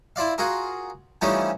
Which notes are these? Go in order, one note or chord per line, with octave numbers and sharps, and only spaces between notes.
E4 F4 D5 F5
F4 F#4 G#4 A#4
E3 F3 G3 A3 C#4 D#4